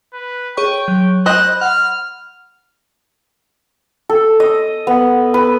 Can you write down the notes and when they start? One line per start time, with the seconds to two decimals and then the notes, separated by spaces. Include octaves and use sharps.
0.13 B4
0.57 G#4 C#5 G5 C#6
0.88 F#3
1.26 C5 D#5 B5 F#6
1.61 F#5 F6
4.09 A4
4.40 D#5
4.87 B3
5.34 B4